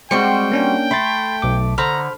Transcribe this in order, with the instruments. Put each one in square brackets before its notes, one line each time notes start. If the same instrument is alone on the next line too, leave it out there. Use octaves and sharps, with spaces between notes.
[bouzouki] G3 C4 F#4 [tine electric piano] G#3 C5 C#7 [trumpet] G5
[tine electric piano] A#3 C#4 D4
[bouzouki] A3 [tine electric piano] B5 C6 A6
[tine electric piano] B1 D6
[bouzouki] D3 [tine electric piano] C5 B5 F6 [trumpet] A#5